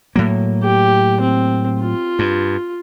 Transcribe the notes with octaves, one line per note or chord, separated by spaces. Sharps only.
A2 F#3 A#3
G4
C4
F4
G2